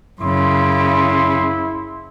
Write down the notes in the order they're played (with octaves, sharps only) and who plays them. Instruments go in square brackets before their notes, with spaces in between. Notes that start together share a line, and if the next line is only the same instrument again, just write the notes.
[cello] F#2 C#3 [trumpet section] E4 C6